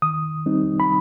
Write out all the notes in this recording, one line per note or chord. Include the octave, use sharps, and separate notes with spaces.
D#3 D#6
G3 C4 D#4
B5